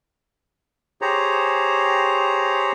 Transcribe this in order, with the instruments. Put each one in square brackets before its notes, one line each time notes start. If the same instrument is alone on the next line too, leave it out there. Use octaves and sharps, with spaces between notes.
[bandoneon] G4 G#4 C5 C#5 A#5